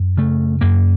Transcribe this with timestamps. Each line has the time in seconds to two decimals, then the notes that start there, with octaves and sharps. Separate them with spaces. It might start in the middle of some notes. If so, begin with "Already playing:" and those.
Already playing: F#2
0.17 C#3 A3
0.61 F#2 A#3